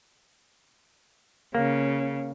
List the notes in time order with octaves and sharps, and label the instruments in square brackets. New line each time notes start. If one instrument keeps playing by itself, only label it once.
[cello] C#3 [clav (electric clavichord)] A#3